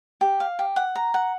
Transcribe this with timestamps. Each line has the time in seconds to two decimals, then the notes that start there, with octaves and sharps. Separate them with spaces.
0.21 G4
0.40 F5
0.59 G4
0.76 F#5
0.95 A#5
1.14 F#5